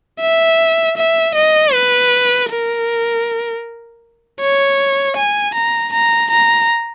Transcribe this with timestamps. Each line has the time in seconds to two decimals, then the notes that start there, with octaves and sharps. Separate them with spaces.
0.21 E5
0.97 E5
1.35 D#5
1.73 B4
2.50 A#4
4.40 C#5
5.17 G#5
5.55 A#5
5.93 A#5
6.31 A#5